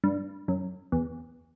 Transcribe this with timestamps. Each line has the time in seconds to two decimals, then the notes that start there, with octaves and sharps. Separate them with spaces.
0.04 G2
0.48 F#2
0.92 E2